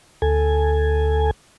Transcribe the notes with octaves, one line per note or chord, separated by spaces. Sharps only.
D2 A4 G#5